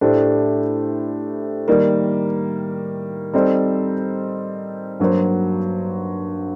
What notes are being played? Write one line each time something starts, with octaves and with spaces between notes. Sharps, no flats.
A2 A3 D4 G4 C5
D#3 G3 A#3
G3 C4 D#4 A4 C5
G2 F#3 A#3 F#4 C5